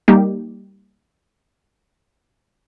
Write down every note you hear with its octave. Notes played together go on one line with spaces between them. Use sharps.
G3 A#3 D#4 G4